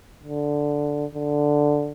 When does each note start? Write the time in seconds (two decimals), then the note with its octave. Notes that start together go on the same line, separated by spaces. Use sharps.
0.23 D3
1.15 D3